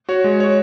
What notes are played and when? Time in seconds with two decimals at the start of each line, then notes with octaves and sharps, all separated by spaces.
0.09 F#4 C#5
0.24 G#3
0.40 F#4 C#5